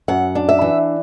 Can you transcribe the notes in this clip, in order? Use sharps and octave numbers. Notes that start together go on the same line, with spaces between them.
F#2 F#5
D4
E5
E3